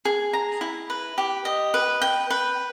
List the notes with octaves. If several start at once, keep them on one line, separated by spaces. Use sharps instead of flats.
G#4
A#5
E4
B4
G4
D#5
B4
G5
B4